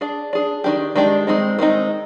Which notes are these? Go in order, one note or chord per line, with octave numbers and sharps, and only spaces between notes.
D4 G#4 D5
D4 G#4 D5
D#3 G#3 D4 G4
D#3 G#3 D4 G4
D#3 G#3 C4 D#4
D#3 G#3 C4 D#4